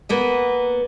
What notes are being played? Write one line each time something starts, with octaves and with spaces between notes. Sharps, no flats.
A#3 B3 D#5